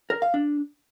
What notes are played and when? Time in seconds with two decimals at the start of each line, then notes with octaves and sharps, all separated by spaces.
0.10 A#4
0.22 F5
0.34 D4